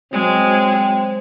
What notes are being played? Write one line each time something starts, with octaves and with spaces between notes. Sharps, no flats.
F#3 G#3 C4